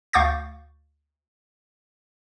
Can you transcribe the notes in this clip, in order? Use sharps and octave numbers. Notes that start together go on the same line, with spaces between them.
D2 F5 C#6 D6 G6 A6